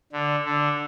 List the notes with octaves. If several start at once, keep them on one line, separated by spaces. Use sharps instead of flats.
D3
D3